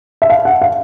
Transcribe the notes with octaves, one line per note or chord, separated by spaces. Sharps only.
E5
F5
F#5
F5